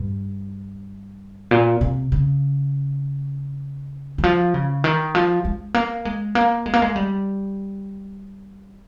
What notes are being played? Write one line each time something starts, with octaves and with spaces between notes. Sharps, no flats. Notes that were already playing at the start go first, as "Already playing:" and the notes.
Already playing: G2
A#2
C3
C#3
D#3
F3
C#3
D#3
F3
G#3
A#3
G#3
A#3
G#3
A#3
G#3
G3